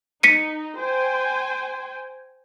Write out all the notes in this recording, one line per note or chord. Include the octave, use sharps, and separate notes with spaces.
D#4 B6 C#7 D#7
C5 G5 G#5